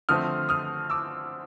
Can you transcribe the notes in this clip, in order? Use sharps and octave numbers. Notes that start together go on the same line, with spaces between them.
D3 F3 A3 C4 D#6 F6
D#6 F6
D6 E6